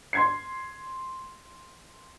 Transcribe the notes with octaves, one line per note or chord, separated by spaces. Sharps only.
C6 G#6 C7